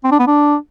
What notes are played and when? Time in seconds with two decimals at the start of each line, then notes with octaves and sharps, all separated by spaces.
0.04 C4
0.12 D4
0.19 B3
0.27 D4